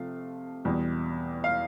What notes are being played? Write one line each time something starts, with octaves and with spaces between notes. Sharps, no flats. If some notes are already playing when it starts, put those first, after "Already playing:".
Already playing: C3 F3 A3 F5
E2 B2 G3
F5